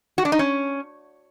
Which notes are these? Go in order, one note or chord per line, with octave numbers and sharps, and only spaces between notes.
F#4
D4
D#4
C#4